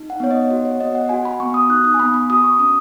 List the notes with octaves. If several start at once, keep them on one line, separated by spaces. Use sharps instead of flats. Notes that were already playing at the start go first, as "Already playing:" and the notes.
Already playing: D#4
F#5
B3 C#5
D#5
F#4 F#5
C#5
B3 D#5
F#5
F#4 G#5
B5
B3 C#6
D#6
D#4 F#6
D#6
G#5
B3 B5
B5
F#4 D#6
C#6
C#4 D#6